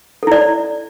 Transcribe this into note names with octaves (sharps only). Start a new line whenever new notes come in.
E4 A4 D5